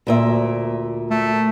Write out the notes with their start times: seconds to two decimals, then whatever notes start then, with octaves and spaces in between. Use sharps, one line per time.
0.07 D2 A#2 E5
1.10 A3